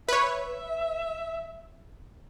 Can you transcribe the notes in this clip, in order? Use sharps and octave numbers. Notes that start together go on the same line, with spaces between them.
B4 C#5 E5